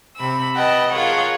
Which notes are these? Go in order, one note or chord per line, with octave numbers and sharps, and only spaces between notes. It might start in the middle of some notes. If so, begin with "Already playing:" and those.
C3 B5 E6
B4 D#5 F#5 G5 A5
F4 G#4 A#4 C#5 F#5